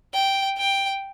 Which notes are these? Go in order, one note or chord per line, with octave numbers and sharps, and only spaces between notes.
G5
G5